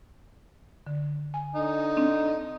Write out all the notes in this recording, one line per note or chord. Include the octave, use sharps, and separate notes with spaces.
D3
G#5
D3 D#4
C4 D4